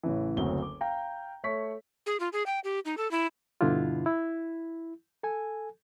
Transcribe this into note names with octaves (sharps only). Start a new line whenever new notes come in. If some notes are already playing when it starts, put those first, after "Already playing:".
A1 C#3 E3
F#1 D2 F#3 C4 G7
D6
F5 G5 A#5
A3 C#5 C#6 B6
G#4
F4
G#4
G5
G4
D#4
A4
E4
G2 B2 D3 D4 E4 F4
E4
A4 G#5